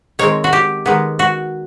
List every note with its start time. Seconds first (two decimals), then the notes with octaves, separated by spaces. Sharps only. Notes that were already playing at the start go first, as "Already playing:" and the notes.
0.19 D#3 G#3 C4 C#5
0.44 F#4
0.53 G4
0.86 D#3 G#3 B3
1.19 F#4